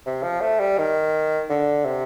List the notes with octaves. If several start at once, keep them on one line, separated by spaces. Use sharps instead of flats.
C3
F3
A3
G3
D#3
D3
C3